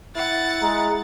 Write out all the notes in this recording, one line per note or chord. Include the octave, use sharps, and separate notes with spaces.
E4 F#5 A6
G#3 A#5